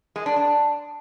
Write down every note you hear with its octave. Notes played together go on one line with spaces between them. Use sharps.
G#3
D4
D4